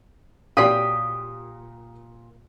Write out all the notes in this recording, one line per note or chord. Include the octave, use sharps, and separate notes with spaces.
A#2 F#3 F4 G4 D5 G5 D#6 B6